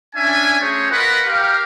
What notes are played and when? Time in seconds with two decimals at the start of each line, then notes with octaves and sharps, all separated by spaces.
0.16 C#4 D4 E5 G#5
0.60 A3 C#4 F#4 G#4 C5 C#5
0.91 F4 A#4 B4 D#5 F#5 B5
1.27 G4 A#4 F5